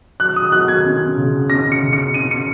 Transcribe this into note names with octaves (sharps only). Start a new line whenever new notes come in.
F#3 F#6
D#6
F#3 F#6
G#6
C#4
C#3
C#4 A#6
C#7
C#3
C#7
C#4 D#7
C#7